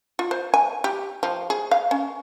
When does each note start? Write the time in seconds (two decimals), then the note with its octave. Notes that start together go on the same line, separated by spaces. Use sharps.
0.19 F4
0.31 C5
0.54 G#5
0.84 G4
1.23 F3
1.50 G#4
1.71 F5
1.91 C#4